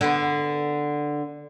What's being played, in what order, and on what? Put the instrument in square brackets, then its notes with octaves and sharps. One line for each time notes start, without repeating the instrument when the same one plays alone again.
[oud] D3 B3